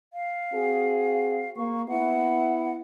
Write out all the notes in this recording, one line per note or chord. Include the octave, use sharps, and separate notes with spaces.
F5
C4 F#4 G#4
A#3 C#6
B3 E4 F#5